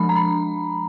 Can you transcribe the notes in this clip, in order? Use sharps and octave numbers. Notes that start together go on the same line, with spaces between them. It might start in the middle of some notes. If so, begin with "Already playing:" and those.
Already playing: F3 G#3 D4 B5
A#5
B5